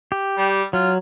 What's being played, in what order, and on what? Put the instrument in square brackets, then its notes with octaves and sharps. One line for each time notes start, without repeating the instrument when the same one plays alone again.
[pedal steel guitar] G4
[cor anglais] G3
[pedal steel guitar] F#3 [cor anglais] F4